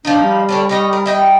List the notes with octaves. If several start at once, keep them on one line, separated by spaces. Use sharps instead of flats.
F3 A#3 D4 D#4
G3
D3 C#4 D4
D#4 C#5 D#5
A#4
E4 D#5 G5